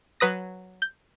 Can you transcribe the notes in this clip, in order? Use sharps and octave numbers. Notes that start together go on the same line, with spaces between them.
F#3 B4 D#6 A#6
G6